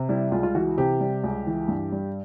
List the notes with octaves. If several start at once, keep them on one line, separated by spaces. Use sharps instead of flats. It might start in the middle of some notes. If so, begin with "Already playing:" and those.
Already playing: C3
G3 E4
C#2 F4
F4
E3 F#4
C3 G4
G3
C#2
E3
G2
G3